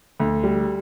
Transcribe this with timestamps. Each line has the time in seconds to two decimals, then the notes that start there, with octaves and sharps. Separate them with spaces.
0.20 D2
0.43 G3